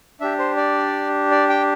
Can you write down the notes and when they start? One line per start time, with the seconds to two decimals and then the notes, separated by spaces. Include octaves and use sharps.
0.20 D4 G4 E5
0.39 C5
0.57 D5
1.31 D5
1.49 G5